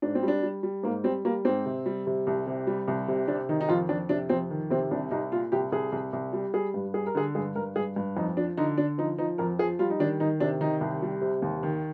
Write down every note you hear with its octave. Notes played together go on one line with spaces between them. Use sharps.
G#2 D4
C4
G3
D4
G3
G3
G#2 A#3
G3 C4
G3 A#3
G#2 C4
C3
G3
C3
C2
C3
G3
C2
C3
C3 D4
D#3 D#4
D#4
F2 F4
F2 D4
C3 D4
F2 C4
D#3
C3 C4
C2 D4
C2 D#4
A#2 F4
C2 G4
C2 G#4
C2
C2
G3
G3 G#4
G2
G3 G#4
A#4
D3 G#4
G2 G#4
G2 A#4
G2 G#4
G2
F2 D#4
F3 D4
D3 D#4
D3 D4
F3 D#4
F3 D#4
F2 A#4
F3 G#4
G3 F4
D#4
D#3 D4
D#3 D#4
C3 D4
D#3 D#4
C2
G3
C3
D#2
D#3